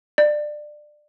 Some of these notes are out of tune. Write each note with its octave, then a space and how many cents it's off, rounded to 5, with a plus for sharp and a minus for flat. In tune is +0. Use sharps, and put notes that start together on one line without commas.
D5 +20